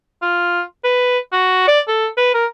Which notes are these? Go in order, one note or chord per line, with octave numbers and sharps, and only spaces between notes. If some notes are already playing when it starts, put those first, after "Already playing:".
F4
B4
F#4
D5
A4
B4
A#4